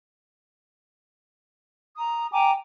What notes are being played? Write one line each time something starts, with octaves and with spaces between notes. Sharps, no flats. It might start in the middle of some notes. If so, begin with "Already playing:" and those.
A#5 D#6
G5 G#5 A#5 D6